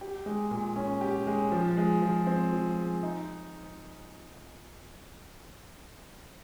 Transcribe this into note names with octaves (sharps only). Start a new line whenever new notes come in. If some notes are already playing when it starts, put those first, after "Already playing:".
G4
G#3
A#2
C#4
G4
G#3
F3
G#3
F3
C4
F3
G#3
D#4